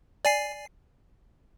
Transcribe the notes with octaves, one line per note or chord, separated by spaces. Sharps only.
D5 G#5 C7